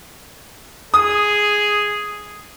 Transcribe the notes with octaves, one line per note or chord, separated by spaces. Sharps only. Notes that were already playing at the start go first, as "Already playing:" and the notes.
G#4 D#6